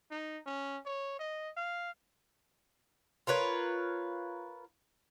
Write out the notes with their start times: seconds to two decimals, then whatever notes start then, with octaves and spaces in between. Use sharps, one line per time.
0.11 D#4
0.46 C#4
0.86 C#5
1.19 D#5
1.57 F5
3.27 F4 A#4 B4 C#5